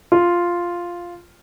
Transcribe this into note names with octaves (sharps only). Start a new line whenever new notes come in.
F4